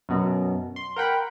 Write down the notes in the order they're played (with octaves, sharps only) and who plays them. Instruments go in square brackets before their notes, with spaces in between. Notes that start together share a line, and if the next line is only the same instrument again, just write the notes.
[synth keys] F#2 B2
C6
A#4 F#5 G5 B5